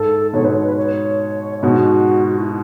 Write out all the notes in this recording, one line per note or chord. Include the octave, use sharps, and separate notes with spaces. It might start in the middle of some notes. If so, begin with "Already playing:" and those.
Already playing: G#2 A4
G#2 B2 C#5
B4
C#5
B4
C#5
G#2 B2 F#4
F#4
E4